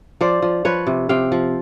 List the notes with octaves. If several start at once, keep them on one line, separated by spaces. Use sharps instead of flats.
F3 C5 D5
F3
F3 B4 C#5
C3
C3 F5 G5
F3